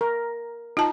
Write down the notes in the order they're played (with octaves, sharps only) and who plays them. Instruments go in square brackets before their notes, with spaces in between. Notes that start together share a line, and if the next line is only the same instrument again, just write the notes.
[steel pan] A#4
[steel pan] D#4 [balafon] F4 A5